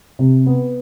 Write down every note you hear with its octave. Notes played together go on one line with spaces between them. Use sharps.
C3
B3